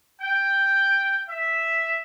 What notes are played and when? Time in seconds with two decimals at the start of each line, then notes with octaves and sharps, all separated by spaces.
0.21 G5
1.27 E5